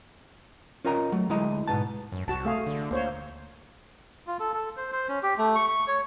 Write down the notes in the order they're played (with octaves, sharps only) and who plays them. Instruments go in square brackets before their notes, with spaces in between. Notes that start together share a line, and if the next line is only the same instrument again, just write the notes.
[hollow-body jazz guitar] C#4 F4 A#4 D#5 A#5
F#3 A3
D2 G#3 E4 D#5 A#5
G#2 B2 B3 A5
[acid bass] F#2
[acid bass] C2 [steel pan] F#4 A5
[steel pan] A3 G#4 F5
[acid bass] D3
[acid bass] D2 [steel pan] A#3 C5 C#5
[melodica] F4
A4
A4
C5
C5
C#4
G4
A3
C#6
C#6
C#5